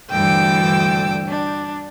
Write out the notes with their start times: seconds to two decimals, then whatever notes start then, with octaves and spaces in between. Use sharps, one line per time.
0.11 D2 G2 E3 G5 D6 E6
1.29 D4